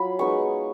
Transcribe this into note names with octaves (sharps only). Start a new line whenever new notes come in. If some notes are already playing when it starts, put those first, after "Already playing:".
Already playing: F#3 F4 B5
G#3 B3 D#4 C#6